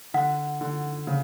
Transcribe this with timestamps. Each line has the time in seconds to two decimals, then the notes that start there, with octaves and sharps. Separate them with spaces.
0.14 D3 F#5
0.61 D3
1.07 C#3